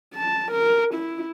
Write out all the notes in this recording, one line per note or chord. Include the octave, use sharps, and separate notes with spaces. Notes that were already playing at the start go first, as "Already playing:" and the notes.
A5
A#4
E4